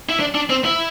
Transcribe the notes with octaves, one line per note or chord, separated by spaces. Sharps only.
E4
D4
D4
C4
E4